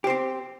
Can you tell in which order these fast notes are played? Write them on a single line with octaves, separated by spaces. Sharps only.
G4 C5 C4